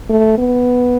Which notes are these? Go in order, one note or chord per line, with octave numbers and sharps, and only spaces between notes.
A3
B3